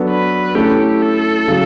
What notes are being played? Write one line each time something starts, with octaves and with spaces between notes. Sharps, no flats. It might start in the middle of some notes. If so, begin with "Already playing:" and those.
Already playing: F#3 B3 D4 F#4 A4
B4
A3 C#4 E4 G4 A4
A4
C#3 F#3